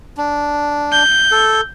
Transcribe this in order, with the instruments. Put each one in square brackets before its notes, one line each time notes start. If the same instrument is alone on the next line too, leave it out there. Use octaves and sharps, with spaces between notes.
[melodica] D4
[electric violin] G6
[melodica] A4